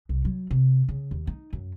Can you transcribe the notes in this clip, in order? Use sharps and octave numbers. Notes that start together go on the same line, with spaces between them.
C2
F#3
C3
C#3
D#2
D#4
F#2